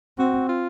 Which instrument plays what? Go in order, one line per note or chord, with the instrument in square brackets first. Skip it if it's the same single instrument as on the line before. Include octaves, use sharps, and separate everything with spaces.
[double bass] C4 [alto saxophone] F#4
[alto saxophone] F4